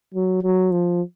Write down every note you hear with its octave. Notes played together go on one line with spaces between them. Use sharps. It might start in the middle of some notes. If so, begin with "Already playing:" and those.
F#3
F#3
F3